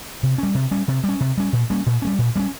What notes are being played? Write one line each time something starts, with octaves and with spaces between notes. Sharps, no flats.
C3
G3 C#4
C3
G3 C#4
C3
G3
C#4
C3
G3 C#4
A#2
G3 A#3 C#4
A#2
G3 A#3 C#4
A#2
G3 A#3 C#4